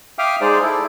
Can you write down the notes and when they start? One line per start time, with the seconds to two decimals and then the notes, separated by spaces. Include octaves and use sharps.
0.19 E5 F5 G5 D6 D#6 F6
0.41 G#3 D#4 G#4 C5 D5
0.62 E4 A4